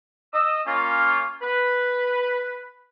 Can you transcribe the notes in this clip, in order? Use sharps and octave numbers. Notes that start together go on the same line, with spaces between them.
D#5 E6
A#3 C#4 F4
B4